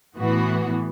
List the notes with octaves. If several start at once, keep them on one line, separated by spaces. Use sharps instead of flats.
A2 E3 B3 F#4